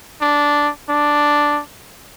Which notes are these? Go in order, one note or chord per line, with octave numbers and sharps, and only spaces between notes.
D4
D4